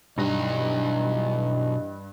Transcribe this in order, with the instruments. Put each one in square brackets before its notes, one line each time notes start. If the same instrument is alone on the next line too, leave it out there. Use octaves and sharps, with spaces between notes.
[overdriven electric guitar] B1 D#4 [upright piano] G2 A#6 [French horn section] E3 D#5